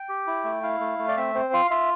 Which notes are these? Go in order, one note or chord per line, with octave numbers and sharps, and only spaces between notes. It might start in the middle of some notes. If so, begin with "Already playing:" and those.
Already playing: G5
G4
E4
A3
E4 F5
A3
A3
D5
C4 E5
C4 C5
F4 F5
F4 E5